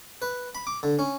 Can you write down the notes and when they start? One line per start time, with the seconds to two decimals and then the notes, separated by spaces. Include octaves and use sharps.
0.22 B4
0.55 B5
0.67 D6
0.83 D3
0.99 C#4